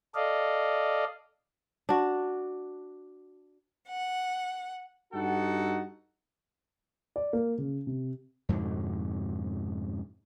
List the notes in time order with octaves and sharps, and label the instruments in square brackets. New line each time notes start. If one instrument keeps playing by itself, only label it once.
[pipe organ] A4 D5 D#5 F5
[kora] D4 F#4
[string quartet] F#5
[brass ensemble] G2 D#4 F#4 A4 F#5
[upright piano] D5
A#3
C#3
C3
[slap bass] F2 G#2 B2 D3